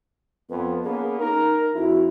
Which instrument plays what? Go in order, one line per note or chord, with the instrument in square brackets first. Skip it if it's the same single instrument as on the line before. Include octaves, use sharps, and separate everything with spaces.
[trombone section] F2 B3 [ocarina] B4
[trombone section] A#3 B3 C#4 [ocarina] G#4
[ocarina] D#4 [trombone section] A#4
[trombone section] F2 E4 [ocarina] F#4